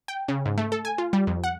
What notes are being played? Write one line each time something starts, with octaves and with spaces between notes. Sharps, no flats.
G5
C#3
G#2
A3
A4
G#5
F4
G3
F2
F#5